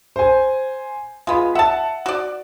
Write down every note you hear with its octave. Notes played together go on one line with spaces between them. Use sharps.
C5 G#5
G#3 B3 F4
E5 F#5 A5
F#4 D5